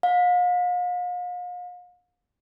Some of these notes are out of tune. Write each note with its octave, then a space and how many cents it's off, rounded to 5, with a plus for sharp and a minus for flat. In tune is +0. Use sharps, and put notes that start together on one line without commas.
F5 +40